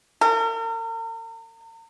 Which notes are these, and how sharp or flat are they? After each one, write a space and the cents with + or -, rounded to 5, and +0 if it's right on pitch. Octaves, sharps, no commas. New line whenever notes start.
A#4 -40